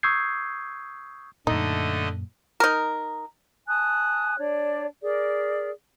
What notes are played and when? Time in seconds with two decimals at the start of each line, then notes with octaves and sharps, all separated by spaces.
0.03 C#6 D#6 E6 G6 G#6 C7
1.47 F#2 A#2 D3 A3 D#4 D#5
2.60 D#4 A#4
3.67 G#5 A5 D#6 F#6
4.38 D4 C#5 D5
5.03 G#4 A#4 D5